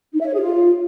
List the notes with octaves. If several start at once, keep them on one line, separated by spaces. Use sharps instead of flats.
D#4
E5
C#5
G#4
F4